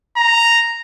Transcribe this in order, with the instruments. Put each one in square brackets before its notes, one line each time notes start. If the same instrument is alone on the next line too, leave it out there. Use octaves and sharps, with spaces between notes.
[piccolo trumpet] A#5